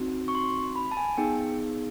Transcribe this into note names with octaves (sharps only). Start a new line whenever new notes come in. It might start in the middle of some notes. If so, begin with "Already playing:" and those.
Already playing: C4 D#4 F#4
C#6
C6
B5
A5
G#5
B3 D#4 G#4 G5